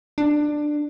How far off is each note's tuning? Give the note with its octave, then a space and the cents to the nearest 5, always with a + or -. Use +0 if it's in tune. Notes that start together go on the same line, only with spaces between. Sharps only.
D4 +15